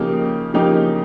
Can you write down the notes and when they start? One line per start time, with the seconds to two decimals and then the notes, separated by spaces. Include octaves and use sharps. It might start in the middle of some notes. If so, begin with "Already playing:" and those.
Already playing: C#3 F3 A#3 D#4 G4
0.54 C#3 F3 A#3 D#4 G4